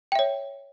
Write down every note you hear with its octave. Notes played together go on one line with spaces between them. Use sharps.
C#5 E5 G5